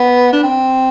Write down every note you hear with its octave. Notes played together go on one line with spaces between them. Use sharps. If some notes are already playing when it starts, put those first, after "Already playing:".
Already playing: B3
D4
C4